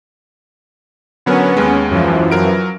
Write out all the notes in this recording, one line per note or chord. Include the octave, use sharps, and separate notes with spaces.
D3 F#3 B3 C#4 A#4
D#2 G#3
F#2 E3 F3
F#3 A#4 D7